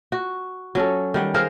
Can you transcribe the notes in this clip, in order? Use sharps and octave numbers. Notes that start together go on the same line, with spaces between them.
F#4
F#3 C#4 A4
D#3 G3 F#5
G#4 A#4 C5 F5